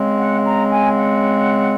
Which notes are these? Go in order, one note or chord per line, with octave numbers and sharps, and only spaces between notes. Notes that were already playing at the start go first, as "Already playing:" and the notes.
Already playing: C#3 G#3 C4
F#5
A#5
G#5
F#5